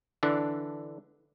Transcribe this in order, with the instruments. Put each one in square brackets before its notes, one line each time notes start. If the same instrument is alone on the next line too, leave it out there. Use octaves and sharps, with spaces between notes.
[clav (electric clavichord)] D3 E3 D4